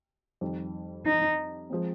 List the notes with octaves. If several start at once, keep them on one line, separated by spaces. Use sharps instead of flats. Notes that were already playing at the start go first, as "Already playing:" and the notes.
F2 D#3 G3
D#4
F3 G#3 C4